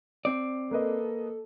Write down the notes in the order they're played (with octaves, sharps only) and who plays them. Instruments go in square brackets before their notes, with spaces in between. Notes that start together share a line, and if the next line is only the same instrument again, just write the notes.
[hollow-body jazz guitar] C4 D5
[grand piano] A#3 B4 D#5 [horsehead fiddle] A4